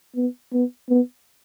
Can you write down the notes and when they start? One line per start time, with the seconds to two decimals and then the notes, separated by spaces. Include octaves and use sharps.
0.15 B3
0.53 B3
0.89 B3